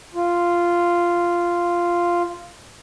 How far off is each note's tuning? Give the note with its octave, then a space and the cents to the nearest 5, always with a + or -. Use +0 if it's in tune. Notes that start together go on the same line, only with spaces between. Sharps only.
F4 -5